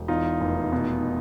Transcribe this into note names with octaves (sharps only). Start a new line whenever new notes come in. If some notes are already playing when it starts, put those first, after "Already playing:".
Already playing: E1
E2 D#4 F4
F1
B2